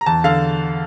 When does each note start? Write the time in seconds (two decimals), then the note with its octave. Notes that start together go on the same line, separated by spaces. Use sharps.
0.01 A#5
0.06 E2 A5
0.24 D3 F5